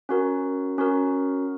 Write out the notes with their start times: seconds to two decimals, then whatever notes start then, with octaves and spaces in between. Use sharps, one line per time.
0.09 C#4 F#4 A#4
0.78 C#4 F#4 A#4